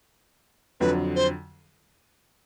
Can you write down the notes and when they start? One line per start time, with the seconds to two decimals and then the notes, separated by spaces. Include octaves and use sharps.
0.80 F2 D3 F#3 B4
1.16 C5